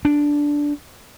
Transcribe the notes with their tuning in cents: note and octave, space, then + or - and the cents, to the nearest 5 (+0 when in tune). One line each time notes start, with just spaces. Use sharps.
D4 -5